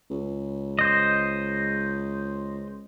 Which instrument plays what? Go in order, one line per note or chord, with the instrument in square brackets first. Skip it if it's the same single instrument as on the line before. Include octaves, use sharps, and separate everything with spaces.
[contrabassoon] C#2
[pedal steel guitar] C5 D#5